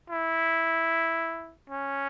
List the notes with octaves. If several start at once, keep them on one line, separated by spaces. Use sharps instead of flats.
E4
C#4